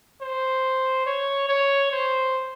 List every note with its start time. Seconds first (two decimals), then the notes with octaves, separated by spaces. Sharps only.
0.22 C5
1.06 C#5
1.49 C#5
1.92 C5